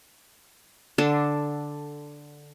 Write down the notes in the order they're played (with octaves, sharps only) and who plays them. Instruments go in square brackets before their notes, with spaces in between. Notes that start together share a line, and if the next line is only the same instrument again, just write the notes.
[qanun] D3 D4 A4